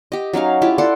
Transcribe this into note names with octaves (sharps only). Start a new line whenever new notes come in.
G4 D#5
F#3 C#4 D#4 F5
E4 F4 G4
A4 D5 F#5 C6